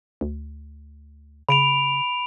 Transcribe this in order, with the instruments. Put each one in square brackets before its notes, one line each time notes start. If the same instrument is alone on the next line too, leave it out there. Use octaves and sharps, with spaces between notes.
[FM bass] D2
[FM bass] C#3 [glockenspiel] B5 D7 F7